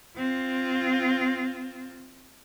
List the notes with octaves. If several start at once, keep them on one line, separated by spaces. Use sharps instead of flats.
C4 F4